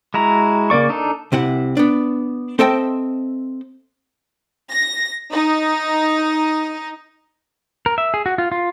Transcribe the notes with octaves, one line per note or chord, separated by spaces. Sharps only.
G#3 E4 F#4 A#5
C#3 A#3 D5 C#6
D4 D#4 A4
C2 C3 E4 F#5
B3 D4
C4 A4 D#5 E5 G5 A5
A#6
D#4
A#4
E5
G#4
F#4
F4
F4